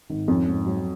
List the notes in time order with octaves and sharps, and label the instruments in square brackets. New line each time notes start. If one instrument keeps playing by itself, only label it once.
[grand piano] G#1
[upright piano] F2 [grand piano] C#4
[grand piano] G#2
F#3